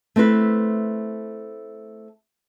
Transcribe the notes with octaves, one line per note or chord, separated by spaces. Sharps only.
A3 C4 E4 B4